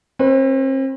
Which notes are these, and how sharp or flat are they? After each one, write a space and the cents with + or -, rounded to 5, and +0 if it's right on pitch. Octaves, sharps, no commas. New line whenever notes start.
C4 +40 B4 -5